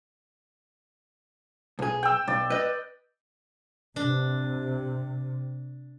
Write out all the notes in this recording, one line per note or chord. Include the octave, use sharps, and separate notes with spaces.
B1 G#4
G5 E6
B1 D5
B4 D#5
C3 D4